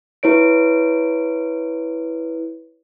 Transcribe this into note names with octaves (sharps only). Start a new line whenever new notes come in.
E4 B4 C#5 D7